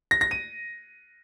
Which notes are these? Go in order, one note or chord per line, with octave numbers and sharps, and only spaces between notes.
A#6
A#6
D#7